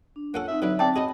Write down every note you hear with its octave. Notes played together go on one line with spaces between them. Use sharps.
D4
A#3 C#4 F4 A4 F#5
C4 D#4 E5
D3 F#3 D4 B4 E5
C4 D5 G5 A5
C#4 F#4 G#4 D#5 B5